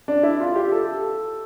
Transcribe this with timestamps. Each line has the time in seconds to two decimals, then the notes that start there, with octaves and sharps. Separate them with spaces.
0.08 D4
0.23 E4
0.40 F4
0.55 G4
0.72 A4